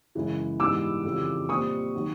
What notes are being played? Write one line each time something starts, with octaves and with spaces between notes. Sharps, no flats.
F#2 C#3 E3 G#3
G#2 E3 G3 B3 D6 E6
F2 C#3 E3 G3
A#2 G3 C4 C#6 D#6
D#3 F#3